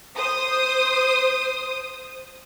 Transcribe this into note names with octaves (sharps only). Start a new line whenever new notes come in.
C5 D#6